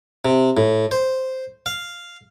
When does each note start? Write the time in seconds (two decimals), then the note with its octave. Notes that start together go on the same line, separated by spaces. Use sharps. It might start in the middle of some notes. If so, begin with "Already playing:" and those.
0.25 C3
0.57 A2
0.91 C5
1.66 F5